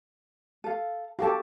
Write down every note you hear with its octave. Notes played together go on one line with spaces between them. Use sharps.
A4 F5
F#4 G4 A4 F5 A5